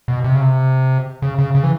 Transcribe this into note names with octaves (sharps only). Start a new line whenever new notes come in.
B2
C3
C#3
C3
C#3
C#3
C#3
E3